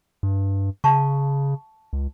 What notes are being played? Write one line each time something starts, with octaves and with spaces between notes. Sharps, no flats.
G2
C#3 F5 A5 C#6
C#2